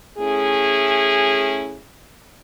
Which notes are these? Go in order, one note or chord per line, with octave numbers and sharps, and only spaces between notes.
A3 C#4 E4 G#4